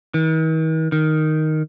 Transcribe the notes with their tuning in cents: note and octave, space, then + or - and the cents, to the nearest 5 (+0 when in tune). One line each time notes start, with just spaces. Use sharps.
D#3 +45
D#3 +0